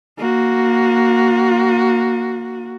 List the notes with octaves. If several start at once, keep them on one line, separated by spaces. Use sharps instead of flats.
A#3 F#4